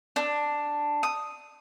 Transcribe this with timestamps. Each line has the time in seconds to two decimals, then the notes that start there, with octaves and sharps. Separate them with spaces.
0.16 D4
1.03 D#6